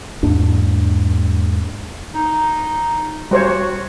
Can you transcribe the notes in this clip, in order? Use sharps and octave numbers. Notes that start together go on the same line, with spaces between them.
E2 G#2 A#3 D4
D#4
G3 F#4 C5 C#5